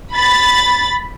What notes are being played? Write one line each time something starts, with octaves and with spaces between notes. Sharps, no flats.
B5 A6